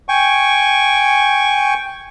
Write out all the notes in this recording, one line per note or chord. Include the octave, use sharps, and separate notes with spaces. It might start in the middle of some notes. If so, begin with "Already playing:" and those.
G5 G#5 C#6